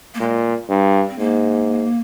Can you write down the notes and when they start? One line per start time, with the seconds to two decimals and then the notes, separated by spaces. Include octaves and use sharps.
0.14 A#3
0.20 A#2 G#3
0.69 G2
1.10 C4
1.18 G#2 A#3